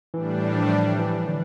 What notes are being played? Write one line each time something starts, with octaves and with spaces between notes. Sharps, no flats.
A2 E3 G3 D4
F3
E3
D3